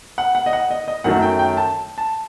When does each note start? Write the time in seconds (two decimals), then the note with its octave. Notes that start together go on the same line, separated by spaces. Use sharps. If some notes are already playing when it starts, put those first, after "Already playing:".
0.18 F#5
0.35 F#5
0.46 D#5
0.53 F#5
0.71 D#5
0.88 D#5
1.04 F#2 D#3 F#3 A3 F#5
1.22 G5
1.39 G5
1.57 A5
1.98 A5